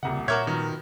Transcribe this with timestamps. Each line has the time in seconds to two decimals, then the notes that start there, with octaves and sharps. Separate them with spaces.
0.03 D#1 C2 C#3 F#5
0.28 A#2 F#4 A#4 C#5 E5 D6 G6 G#6
0.47 D#3 F3 F#3 B3